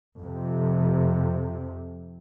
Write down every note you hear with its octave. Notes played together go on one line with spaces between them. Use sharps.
F2 C3